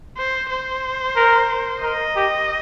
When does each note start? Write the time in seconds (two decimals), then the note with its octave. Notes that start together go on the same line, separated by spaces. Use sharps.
0.17 C5
0.50 C5
1.16 A#4
1.83 A#4 D#5
2.16 G4